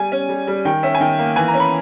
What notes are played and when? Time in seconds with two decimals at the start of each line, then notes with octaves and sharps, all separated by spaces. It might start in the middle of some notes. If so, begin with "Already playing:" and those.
Already playing: G3 G#5
0.12 C#4
0.29 G3
0.47 G3
0.65 D#3 G5
0.83 C#4 E5
0.95 G#5
1.01 D#3 G5
1.19 A#3
1.36 E3 G#5
1.48 A#5
1.54 C#4
1.60 B5